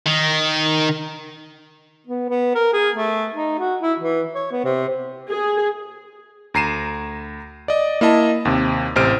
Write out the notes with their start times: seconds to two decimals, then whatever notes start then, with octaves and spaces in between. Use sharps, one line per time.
0.06 D#3
2.07 B3
2.29 B3
2.55 A#4
2.73 G#4
2.96 A3
3.34 D#4
3.59 F#4
3.81 E4
4.00 E3
4.35 C#5
4.52 B3
4.64 C3
5.30 G#4
6.54 D2 A#5 C7 D#7 E7
7.68 D5 D#5
8.01 A#3 E4 D#5 A5
8.45 D#2 C3
8.96 A1 C3 C5 F6 D7 D#7